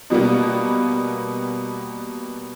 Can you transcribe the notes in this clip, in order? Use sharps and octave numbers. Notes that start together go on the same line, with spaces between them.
B2 G3 A#3 B3